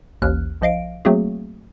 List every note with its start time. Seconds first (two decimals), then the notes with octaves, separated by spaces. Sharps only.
0.22 A1 D#2 F6 F#6
0.61 A#1 F3 D#5 F5 D7
1.05 F#3 A3 A#3 C4 F#4 G#4